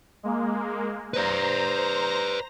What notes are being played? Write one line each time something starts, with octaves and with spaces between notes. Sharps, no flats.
G#3 A#3
B4 C5 D5 A#5 A#6